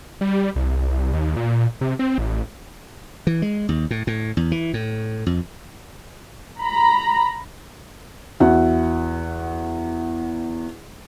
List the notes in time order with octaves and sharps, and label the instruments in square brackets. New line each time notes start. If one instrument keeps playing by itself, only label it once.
[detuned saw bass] G3
C2
D#2
A#2
C3
C4
A1
[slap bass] E3
G#3
D#2
A2
A2
E2
E3
A2
F2
[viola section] A#5 B5
[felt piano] E2 F#4 E5 F#5